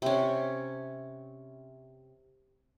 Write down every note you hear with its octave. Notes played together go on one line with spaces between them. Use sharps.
C3 C#4